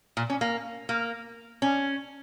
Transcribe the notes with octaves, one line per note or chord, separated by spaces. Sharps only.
A#2
C#4
A#3
A#3
C#4